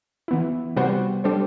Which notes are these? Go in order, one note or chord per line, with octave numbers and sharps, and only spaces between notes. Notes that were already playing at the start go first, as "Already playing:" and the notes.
E3 B3 E4
C3 G3 B3 F#4 C5
G3 D4 A4 C5